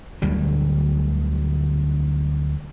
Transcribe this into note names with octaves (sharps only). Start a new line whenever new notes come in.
D2 D3 F#3 G3